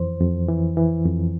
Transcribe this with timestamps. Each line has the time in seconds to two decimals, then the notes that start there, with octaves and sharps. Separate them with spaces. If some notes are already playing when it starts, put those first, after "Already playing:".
Already playing: F2 E3 C5
0.21 F2
0.49 E3
0.77 E3
1.06 F2